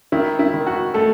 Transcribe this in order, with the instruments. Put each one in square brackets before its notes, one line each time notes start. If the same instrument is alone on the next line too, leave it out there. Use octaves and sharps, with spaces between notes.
[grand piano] D#3 [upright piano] E4
[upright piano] E4
[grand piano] D#3
[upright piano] F#4
[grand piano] A3 [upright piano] A4